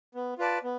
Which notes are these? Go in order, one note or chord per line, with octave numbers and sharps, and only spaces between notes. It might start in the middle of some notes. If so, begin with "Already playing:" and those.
B3
F4 B4 D5 A5
B3